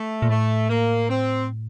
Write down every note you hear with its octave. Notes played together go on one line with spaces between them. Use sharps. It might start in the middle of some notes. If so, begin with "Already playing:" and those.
Already playing: A3
A#2
A2 A3
A#3
C4